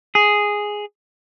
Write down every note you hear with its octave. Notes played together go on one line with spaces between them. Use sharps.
G#4